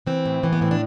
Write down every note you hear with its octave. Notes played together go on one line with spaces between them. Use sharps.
E3 C4
A2
E3
B3
A2 C4
D4